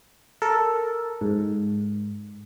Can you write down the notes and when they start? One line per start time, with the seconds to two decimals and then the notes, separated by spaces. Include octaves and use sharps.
0.42 A4 A#4
1.21 G#2